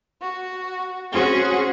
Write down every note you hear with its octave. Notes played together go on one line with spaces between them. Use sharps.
F#4
C#4 F#4 G#4 C5